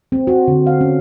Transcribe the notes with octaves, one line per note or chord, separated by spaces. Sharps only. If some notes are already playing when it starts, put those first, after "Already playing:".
C4
F#4
D3
F5
C#4